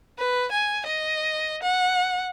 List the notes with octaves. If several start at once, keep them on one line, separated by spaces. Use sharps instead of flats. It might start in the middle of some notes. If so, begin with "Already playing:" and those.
B4
G#5
D#5
F#5